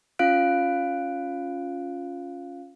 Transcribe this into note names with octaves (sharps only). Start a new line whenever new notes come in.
C#4 F4 F5 F#6 D7